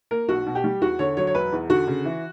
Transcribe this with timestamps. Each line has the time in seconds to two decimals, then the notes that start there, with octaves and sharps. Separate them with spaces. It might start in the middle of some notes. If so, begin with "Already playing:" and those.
0.11 A#3 A#4
0.29 B1 F#4
0.46 B2
0.55 G4
0.64 G3
0.82 E2 F#4
0.99 D3 C#5
1.17 F#3 C#5
1.27 C#5
1.34 E1 B4
1.52 E2
1.70 D3 F#4
1.88 C#3
2.05 E3